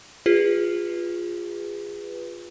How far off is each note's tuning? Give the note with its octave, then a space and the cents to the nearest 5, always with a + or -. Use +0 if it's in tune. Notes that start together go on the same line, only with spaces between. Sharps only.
F4 +0 G#4 -30 B4 +0